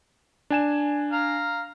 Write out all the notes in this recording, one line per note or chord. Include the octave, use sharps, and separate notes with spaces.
D4 G#5 E7
F5 A#5